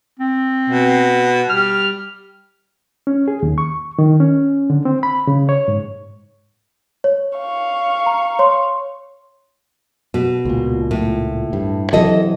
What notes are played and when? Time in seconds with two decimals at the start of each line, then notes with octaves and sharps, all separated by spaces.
0.19 C4
0.70 B2
1.49 G3 F6
3.07 C#4
3.28 G#4
3.43 D#2
3.58 C#6
3.99 D#3
4.20 C#4
4.70 D3
4.85 C4
5.03 B5
5.27 C#3
5.49 C#5
5.68 G#2
7.04 C#5
7.38 F5 C#6
8.06 A#5
8.39 C#5 C6
10.14 B2
10.45 C#2 A#2
10.91 A2
11.53 G2
11.93 C3 E3 F#3 A4 D#5